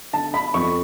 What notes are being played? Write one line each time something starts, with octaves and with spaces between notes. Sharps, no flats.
D3 A5
B5
F2 C#6